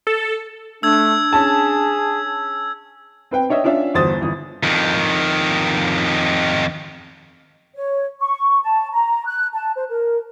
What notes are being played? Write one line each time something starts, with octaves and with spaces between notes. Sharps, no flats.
A4
A3 D4 E6 G#6
C#4 G#4 A5
C4 B4 G5
D4 C#5 D#5 E5
C#4 D4 F4 E5
G1 E2 F#4 C5 D#6 A6
G1 E3 D#6
F2 D#3
C#5
C#6
A5
A#5
F#6
A5
C5
A#4